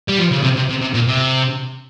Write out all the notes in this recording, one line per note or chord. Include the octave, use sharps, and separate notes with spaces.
G3
F3
C#3
C3
C3
C3
C3
A#2
C3